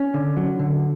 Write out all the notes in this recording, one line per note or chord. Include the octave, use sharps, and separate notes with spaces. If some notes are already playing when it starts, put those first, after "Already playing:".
Already playing: C#4
D3
F#3
D3